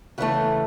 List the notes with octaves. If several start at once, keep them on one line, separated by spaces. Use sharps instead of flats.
C#3 E3 A3 F#5